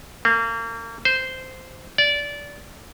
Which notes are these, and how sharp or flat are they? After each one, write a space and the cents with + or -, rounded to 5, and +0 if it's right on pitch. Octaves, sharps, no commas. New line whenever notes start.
A#3 -35
C5 -10
D5 -20